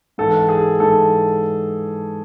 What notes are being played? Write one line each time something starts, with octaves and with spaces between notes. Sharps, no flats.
G#2 E3 A4
G#4
G#2 E3 A4